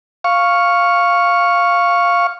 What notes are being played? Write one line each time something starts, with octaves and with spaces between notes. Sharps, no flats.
F5 C#6